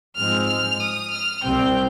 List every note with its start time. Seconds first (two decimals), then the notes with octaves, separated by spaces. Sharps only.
0.16 G#2 F3 G#3 C4 F6
0.47 F6
0.80 D#6
1.11 F6
1.43 C2 C3 G3 C4 G5